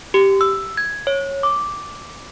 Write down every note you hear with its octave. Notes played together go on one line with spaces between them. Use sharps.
G4
E6
G#6
C#5
D6